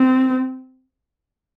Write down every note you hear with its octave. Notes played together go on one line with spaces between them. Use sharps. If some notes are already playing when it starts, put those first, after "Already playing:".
Already playing: C4